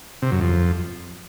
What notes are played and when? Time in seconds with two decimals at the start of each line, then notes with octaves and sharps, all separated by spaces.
0.22 C3
0.32 F#2
0.41 F2